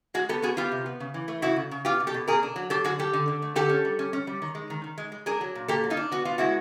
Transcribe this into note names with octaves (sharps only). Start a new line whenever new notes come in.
G#3 F#4 G#4
B3 G4 A4
B3 F#4 G#4
B3 F4 G4
C3
B3
C#3
E3
A3
C#3 E4 F#4
C#3
C#3
B3 F4 G4
B2
G4 A4
B2
B2 G#4 A#4
D4
F#3
F#3 G4 A4
D3 F#4 G#4
D3 G4 A4
D3
D3
A3
D3 G4 A4
C#4
G3
C#4
C#4
G3
D#3
G#3
D#3
D#3
G#3
G#3
D4 G#4 A#4
F#3
A#2
A#3 G4 A4
F#3
D#4 F4
D4
B3 F#4
B3 F4
G#3 E4 F#4